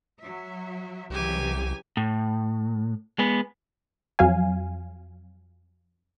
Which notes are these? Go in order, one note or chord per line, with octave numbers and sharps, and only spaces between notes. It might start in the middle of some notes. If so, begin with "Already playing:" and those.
F#3 E5
C2 C#3 E3 F#3 G4 G#5
A2
G#3 B3
F2 F#3 F5 G#5